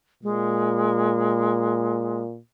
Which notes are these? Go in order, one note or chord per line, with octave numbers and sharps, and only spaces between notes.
A#2 G#3